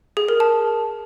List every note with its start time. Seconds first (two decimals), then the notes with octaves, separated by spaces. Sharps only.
0.17 G#4
0.28 A#4
0.40 A5